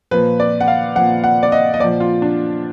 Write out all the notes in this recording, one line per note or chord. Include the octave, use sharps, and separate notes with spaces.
A#2 F3 B4
D5
F#5
F5
A#2 F3 F#5
F#5
D5
D#5
D#5
A#2 F3 D5
F4
D4